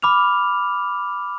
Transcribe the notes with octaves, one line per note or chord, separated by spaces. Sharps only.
B5 D6 F6 F7